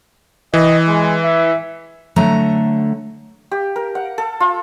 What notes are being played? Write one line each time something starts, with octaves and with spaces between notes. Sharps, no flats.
E3 D#5
G#3
E5
D3 F#3 A3 A#5
G4
A#4
F#5
A4
F4